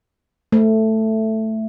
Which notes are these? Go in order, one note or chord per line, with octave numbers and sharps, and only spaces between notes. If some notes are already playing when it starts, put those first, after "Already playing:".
A3